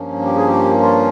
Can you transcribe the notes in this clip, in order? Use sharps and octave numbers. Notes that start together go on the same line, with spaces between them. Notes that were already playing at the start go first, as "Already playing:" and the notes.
Already playing: G2 F3 A#3 C#4
G4
G#4
G4
F4